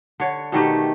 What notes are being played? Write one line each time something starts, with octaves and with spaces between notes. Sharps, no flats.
D3 C#5
B2 D#3 A3 G4